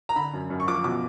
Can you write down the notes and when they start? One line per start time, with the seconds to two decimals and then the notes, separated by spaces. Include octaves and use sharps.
0.09 A#5
0.16 D3 B5
0.33 F#2
0.50 F#2
0.60 C#6
0.68 F3 D6
0.84 B2 D6